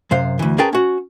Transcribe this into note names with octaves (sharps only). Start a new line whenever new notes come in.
F#2 C3 C5 F5
D2 E3
C#4 G#4 A#4 B4 G5 A5
C#4 F#4